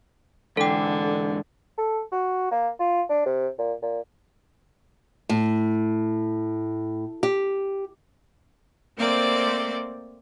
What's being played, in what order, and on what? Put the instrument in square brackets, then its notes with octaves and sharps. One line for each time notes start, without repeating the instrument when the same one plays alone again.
[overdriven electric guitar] G#2 E3 [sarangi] D3 [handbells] A4 G5
[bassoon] A4
F#4
A#3
F4
D4
C3
A#2
A#2
[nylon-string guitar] A2
G4
[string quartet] A3 A#3 C4 C5 D5